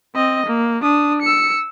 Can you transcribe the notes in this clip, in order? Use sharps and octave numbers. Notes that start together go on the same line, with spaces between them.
C4 D#5
A#3
D4 D#6
E6 C#7